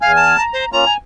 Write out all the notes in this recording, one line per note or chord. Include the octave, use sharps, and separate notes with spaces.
E2 F5 G#5 F6
A5
A#5
C5
A#3 C#4 F4 A#5
G#5